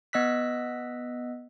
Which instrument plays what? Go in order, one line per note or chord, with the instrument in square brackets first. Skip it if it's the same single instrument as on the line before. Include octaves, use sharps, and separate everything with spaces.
[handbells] B3 D#5 E6 F#6 B6